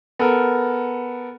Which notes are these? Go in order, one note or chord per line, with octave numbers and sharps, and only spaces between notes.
B3 A4 A#4